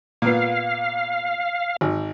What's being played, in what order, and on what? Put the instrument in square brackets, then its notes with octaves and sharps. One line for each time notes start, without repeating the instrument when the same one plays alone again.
[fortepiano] A#2 B3 [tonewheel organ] F5
[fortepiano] G#1